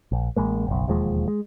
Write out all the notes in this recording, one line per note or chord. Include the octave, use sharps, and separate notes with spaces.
A#1
A1 G#3 A#3
F#1 B1
E1 D#2 F3 G#3
G#3